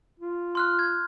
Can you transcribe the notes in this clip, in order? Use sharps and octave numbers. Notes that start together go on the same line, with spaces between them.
F4
C6 F6 F#6
G#6